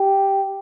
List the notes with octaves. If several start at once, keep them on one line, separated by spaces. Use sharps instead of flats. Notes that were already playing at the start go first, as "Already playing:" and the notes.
Already playing: G4